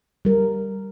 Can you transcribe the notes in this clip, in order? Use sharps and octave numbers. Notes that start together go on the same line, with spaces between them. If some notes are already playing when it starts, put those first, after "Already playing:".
G3 A#4